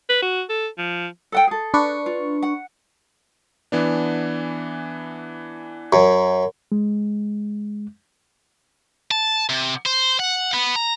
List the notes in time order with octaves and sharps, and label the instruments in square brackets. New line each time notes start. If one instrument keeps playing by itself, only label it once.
[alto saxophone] B4
F#4
A4
F3
[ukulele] A4 F#5 G5
G#4 A4
[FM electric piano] D4 B4 C#6
[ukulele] F4
F#5
[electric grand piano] E3 B3 D4
[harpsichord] F#2
[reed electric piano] G#3
[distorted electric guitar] A5
C3
C5
F#5
B3
A#5